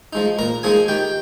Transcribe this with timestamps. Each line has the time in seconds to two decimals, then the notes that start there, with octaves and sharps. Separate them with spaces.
0.13 F3 G#3 D#4
0.39 A#2 A#4 A#5
0.63 F3 G#3 D#4 G#4 G#5
0.88 D#3 G4 G5